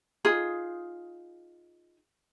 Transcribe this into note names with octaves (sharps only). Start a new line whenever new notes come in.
D#4 F4 G#4